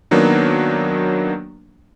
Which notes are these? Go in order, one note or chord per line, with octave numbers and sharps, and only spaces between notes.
D#3 F#3 A#3 B3 D4